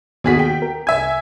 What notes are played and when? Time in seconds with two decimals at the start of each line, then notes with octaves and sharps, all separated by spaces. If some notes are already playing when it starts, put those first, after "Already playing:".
0.24 D#2 B2 F#4 G#4 B6
0.39 G5
0.62 A#4
0.87 C2 E5 G#5 E6 G#6